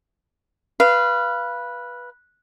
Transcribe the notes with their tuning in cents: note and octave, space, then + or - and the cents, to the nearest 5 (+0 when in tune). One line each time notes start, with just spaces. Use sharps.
B4 -10 F5 -20